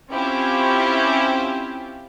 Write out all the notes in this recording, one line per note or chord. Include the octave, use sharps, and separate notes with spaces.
C4 C#4 E4 F4 G4 C5